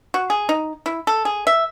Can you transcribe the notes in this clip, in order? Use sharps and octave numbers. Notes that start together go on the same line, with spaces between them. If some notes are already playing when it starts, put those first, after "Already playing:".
F#4
G#4
D#4
E4
A4
G#4
E5